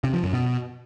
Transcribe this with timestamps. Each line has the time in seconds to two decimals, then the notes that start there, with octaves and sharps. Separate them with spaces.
0.04 C3
0.14 F3
0.23 F#2
0.33 B2